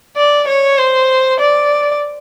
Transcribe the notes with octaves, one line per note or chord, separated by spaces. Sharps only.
D5
C#5
C5
D5